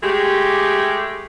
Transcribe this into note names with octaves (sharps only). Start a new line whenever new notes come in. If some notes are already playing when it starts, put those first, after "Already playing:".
G#3 A3 G4